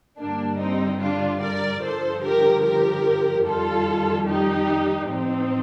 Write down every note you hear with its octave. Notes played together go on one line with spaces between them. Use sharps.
G2 D3 G3 A#3 D4
C4 D#4
D4 F4
A#4 D5
G2 D3 F3 A4 C5
G4 A#4
G4 A#4
F2 D#3 G3 F4 A4
D#4 G4
A2 F3 C4 D#4